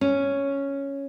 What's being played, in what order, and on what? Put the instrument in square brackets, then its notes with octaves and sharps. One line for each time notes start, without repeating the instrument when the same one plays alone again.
[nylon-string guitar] C#4